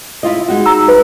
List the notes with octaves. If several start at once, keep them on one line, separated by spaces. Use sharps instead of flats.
E4 F4 D#5
G#3 D#4 F#4
A#5 E6
B4